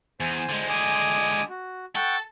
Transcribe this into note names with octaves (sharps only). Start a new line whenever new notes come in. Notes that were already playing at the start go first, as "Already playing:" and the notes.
E2 C5 G#5
D3 G#3
G#5 D6 D#6
F#4
A4 F#5 G5 C#6